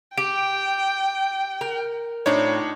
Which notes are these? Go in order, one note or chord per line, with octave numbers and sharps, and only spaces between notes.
G4 G5 D7
A#4
A2 C4 D4 D#4 F4 C#5